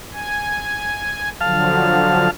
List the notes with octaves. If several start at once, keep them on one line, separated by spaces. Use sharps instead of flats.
G#5
D3 F3 F#3 F5 A5 F6